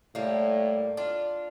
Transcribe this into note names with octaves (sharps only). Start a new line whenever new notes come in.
A2 G3 A#3
D4 F4